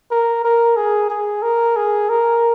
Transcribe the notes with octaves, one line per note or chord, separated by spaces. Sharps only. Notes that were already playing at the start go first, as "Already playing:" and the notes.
A#4
A#4
G#4
G#4
A#4
G#4
A#4